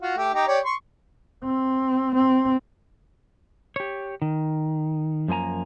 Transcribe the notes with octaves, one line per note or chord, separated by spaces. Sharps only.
F4 F#4
A3 G4
D#4 G4 A#5
G4 C#5 D5
C6 C#6
C4
C4
G4 C#5
D#3
F#2 F3 A#3 G#5 A#5